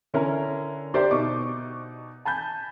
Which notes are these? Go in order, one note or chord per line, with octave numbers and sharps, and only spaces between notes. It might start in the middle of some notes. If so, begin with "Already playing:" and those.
D3 C#4 E4 A#4
D4 G4 A#4 C5 D5 E5
B2 D#4 C#6 D6
G#5 A5 B5 G6